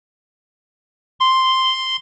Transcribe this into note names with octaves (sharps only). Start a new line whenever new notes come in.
C6